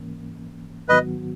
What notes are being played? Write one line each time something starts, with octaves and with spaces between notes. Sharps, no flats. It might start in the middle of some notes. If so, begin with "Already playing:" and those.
Already playing: G#2 E3 A#3 C#4
G#2 D#3 F#3 B3 F#4 B4 D#5